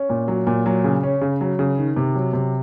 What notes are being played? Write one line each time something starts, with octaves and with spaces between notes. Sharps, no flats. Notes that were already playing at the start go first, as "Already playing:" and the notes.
Already playing: C#4
A#2
F#3
A#2
F#3
C#3
C#4
C#3
F#3
C#3
D#3
C3
F#3
C3